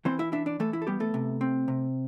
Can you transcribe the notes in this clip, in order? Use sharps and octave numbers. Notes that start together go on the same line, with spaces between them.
E3 C4 C5
E4 E5
D4 E4 E5
D4 D5
E3 A3 A4
E4
A4
G3 B3 G4
A3 A4
C3
C4
C3